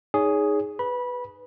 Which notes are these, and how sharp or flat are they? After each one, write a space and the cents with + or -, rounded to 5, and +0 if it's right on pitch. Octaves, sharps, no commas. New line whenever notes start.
D#4 +0 G#4 +0 C#5 +25
B4 +5 B5 -20